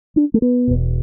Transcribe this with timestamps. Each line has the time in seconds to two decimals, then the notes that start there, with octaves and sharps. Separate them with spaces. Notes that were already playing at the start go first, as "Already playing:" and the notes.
0.16 D4
0.34 A3
0.42 B3
0.67 E1 E2 B2